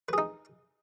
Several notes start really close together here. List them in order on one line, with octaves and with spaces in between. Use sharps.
B4 G#4 D#4